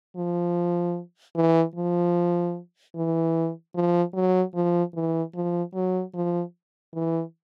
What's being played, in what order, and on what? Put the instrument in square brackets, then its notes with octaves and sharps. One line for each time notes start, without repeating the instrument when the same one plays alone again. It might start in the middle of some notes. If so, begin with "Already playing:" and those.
[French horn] F3
E3
F3
E3
F3
F#3
F3
E3
F3
F#3
F3
E3